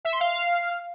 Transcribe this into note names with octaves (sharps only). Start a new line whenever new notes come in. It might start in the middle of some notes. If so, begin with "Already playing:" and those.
E5
C6
F5